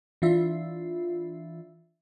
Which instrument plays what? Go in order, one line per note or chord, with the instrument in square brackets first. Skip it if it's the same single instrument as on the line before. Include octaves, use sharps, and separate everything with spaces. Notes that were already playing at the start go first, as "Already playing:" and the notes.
[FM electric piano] E3 D4 F4 E5